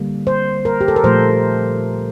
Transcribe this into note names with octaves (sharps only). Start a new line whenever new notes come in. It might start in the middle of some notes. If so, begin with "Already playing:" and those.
Already playing: D3 G3 A#3
C5
A#4
G4
A4
A#4
A#2 F3 A3 C5